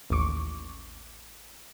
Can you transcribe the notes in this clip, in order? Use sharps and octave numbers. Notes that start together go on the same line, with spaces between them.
A1 D#2 C#6 D6